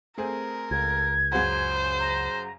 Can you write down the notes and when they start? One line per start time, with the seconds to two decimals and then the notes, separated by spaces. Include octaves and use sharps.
0.18 A3 C4 G#4 A#4
0.71 C#2 G#6
1.32 F#2 C#3 F#4 C5
1.99 A#5